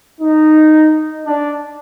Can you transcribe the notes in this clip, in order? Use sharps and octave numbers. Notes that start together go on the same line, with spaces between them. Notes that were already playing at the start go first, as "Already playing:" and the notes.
D#4
D4